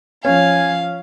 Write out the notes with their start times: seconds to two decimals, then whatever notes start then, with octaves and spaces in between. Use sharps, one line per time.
0.25 F3 C#4 F5 G#5